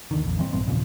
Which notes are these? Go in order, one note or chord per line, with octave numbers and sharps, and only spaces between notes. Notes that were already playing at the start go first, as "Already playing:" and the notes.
D#2 D3 D#3
A#1 F2
E3 G3 C4
A#1 G2 B3 C4
D#2 A#2 C#3 F3